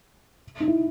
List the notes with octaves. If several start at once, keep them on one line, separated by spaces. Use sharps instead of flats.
D#4
E4